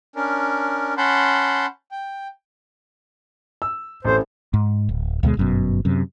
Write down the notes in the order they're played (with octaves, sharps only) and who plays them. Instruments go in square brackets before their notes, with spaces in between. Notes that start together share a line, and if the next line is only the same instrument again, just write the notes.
[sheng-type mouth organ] C#4 D4 A#4
C#4 F#5 A5 B5 C6 G6
G5
[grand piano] E6
[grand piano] A1 C4 A4 [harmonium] C5
[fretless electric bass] G#2
D1
D2 B2 G#3
G1 F#2 B2
F#2 C3